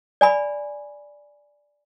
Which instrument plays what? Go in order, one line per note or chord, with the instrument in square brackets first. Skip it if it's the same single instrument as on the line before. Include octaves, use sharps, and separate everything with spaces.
[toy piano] D5 G#5 B5